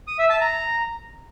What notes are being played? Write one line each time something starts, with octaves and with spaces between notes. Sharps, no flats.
D#6
E5
A5
A#5